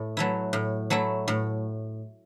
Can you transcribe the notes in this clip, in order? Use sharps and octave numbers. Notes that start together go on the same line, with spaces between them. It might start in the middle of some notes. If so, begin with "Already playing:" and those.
Already playing: A2
F#3 A3 E4
A2
F#3 A3 E4
A2